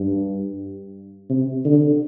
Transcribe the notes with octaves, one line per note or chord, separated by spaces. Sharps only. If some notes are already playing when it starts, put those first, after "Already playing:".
Already playing: G2
C3
D3